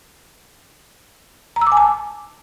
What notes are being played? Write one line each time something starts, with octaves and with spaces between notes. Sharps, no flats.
A#5
E6
D6
G#5
A5